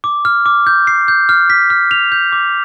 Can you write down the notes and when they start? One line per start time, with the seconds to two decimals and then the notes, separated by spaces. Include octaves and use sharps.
0.04 D6
0.25 F6
0.46 D6
0.67 G6
0.87 C7
1.08 G6
1.29 F6
1.50 B6
1.70 F6
1.91 F7
2.12 G6
2.32 D6